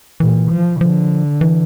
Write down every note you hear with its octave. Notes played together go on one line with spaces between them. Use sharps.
A#2 E3
F3
D3 F3
E3